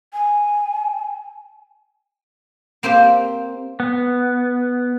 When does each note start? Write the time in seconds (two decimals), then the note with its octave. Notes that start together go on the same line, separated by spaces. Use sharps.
0.13 G#5
2.83 A#3 C4 G4 C5
3.80 B3